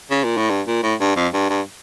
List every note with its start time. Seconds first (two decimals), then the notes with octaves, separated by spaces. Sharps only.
0.11 C#3
0.24 A#2
0.37 A2
0.50 G2
0.67 A#2
0.83 A2
1.00 G2
1.16 F2
1.33 G2
1.49 G2